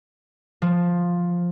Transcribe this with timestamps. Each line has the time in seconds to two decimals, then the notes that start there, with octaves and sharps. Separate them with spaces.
0.62 F3